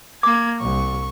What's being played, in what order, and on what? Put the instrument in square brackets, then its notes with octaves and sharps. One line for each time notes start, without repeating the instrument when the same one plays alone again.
[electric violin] A#3 G#6 [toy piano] D6
[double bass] C2 [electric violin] C#6